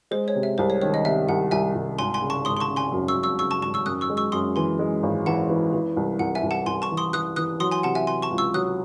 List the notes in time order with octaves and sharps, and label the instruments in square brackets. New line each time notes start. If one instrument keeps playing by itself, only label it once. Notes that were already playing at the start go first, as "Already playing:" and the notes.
[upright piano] G#3 [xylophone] C5
[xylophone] C#5
[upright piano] C3
[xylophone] E5
[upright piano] C2 [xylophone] C5
[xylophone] C#5
[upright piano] D#3 [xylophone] C#5
[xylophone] D#5
[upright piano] C3 [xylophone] E5
[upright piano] C2 [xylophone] F#5
[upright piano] C2 [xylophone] E5 G#5
[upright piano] C2
[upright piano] G#1 [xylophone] G#5 C6
[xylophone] G#5 C6
[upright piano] C#3
[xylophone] A5 C#6
[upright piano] G#1 [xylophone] C6 D#6
[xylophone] C6
A5 C#6
[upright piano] C#3
[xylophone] G#5 C6
[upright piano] F#2
[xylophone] C#6 E6
[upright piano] F#2
[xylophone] C#6 E6
[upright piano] C#3 [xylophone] C#6 E6
[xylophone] A5 C#6
[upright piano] G#1 [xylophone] A5 C#6
[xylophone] C#6 E6
[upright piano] F#2 [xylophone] D#6 F#6
[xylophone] C#6 E6
[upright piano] G#3
[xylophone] C#6 E6
[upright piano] F#2 [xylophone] C6 D#6
[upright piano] E3 [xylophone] G#5 C6
[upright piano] G#3
G#1
[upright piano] E3 [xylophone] F#5 A5
[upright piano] E3
E3
C2
[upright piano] C2 [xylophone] F#5
[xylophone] E5 G#5
[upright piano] C2
[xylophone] F#5 A5
[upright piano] C2 [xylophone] G#5 C6
[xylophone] A5 C#6
[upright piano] E3
[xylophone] C6 D#6
[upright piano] E3 [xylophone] D#6 F#6
[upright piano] E3 [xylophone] D#6 F#6
[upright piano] F#3 [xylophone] C6 D#6
[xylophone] G#5 C6
[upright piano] C3 [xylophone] F#5 A5
[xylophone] E5 G#5
[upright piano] C3 [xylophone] G#5 C6
[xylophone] A5 C#6
[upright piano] C#2
[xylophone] C#6 E6
[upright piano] F#3 [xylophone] D#6 F#6